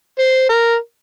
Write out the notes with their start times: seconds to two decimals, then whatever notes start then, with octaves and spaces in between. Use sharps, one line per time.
0.19 C5
0.49 A#4